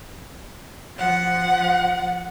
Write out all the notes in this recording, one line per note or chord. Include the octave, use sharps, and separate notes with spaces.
F3 F#5